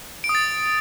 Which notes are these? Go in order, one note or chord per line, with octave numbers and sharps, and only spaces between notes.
D7
D#6
A6